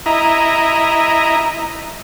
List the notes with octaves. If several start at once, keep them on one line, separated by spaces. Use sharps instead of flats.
E4 D#5 A#5